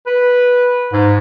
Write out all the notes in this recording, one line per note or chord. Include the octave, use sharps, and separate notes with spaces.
B4
G#2